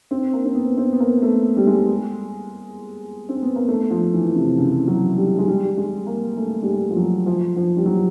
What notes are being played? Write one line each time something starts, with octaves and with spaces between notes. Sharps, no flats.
C4
A#3
C4
B3
C4
B3
A#3
A3
G3
G#3
C4
B3
A#3
A3
F3
E3
C3
C#3
F#3
G3
G#3
G3
G#3
A#3
A3
G3
G#3
F3
F#3
F3
F3
G3
F#3